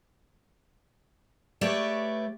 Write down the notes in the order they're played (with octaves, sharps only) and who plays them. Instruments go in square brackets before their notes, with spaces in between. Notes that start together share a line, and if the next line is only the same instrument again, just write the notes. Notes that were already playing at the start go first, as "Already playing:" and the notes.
[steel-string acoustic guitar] A3 G4 B4 C#5 D5